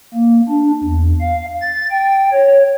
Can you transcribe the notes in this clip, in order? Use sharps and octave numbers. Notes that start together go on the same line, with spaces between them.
A#3
D4
E2
F5
A6
G5
C#5